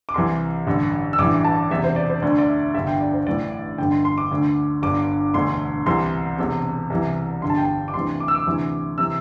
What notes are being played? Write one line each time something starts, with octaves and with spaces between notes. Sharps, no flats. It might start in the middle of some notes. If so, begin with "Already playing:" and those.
D6
C2 C3 E3 C6
A1 G2 D3
E6
A1 G2 E3 D6
A5
E1 E2 C3 E5
C5
D5
C5
D2 D3 D5
D5
E5
G1 G2 D3 E5
G5
D5
C5
A1 A2 E3 D5
G1 G2 D3 G5
C6
C6
D6
D2 D3
G1 G2 D3 D6
E1 D2 D3 C6
C2 C3 E3 C6
E1 E2 C3
C2 C3 E3
G1 G2 D3 C6
A5
G5
A5
D6
D2 C3 E3 C6
D6
E6
D6
D2 C3 E3
C3 E3 E6